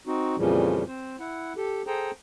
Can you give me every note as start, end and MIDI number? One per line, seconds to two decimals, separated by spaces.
0.07 0.36 60
0.07 0.36 63
0.07 0.36 66
0.37 0.83 41
0.37 0.83 46
0.37 0.83 49
0.37 0.83 52
0.37 0.83 53
0.37 0.83 55
0.87 1.16 60
0.87 1.16 72
1.20 1.53 64
1.20 1.53 78
1.57 1.82 67
1.57 1.82 69
1.87 2.11 68
1.87 2.11 69
1.87 2.11 72
1.87 2.11 79
1.87 2.11 82